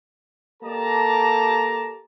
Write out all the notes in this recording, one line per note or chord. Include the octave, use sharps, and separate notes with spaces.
A#3 G4 A4 D5 A5 A#5